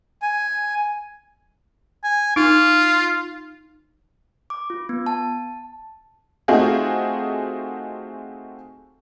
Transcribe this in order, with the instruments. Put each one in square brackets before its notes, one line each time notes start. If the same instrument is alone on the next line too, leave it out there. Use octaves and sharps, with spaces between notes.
[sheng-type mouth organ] G#5
[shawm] G#5
[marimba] D#4 [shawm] F4
[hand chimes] D6
F4
B3
A5
[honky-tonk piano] A3 C4 D#4 F4 F#4 G#4